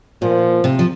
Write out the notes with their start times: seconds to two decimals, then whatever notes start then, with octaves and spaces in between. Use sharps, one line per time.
0.22 A#2 F3
0.64 C3
0.79 F3